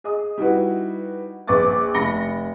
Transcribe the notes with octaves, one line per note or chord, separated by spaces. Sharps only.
G#4 D#5 D#6
G3 D#4 E4 F#4 B4
A#1 B4 C#6 D6 A6
F1 B5 A#6 C#7 G7